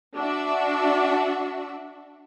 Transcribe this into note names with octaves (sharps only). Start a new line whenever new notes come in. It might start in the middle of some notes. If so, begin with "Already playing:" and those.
D4 F#4 E5